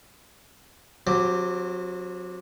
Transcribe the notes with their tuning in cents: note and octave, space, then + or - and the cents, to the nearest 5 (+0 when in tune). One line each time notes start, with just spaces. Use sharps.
F#3 -30 C4 +0 G4 +0